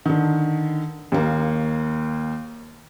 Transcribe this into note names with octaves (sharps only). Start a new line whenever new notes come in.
D3 D#3
D#2 A#3